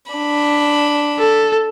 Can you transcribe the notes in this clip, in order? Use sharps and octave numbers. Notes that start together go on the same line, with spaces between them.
D4 B5
A4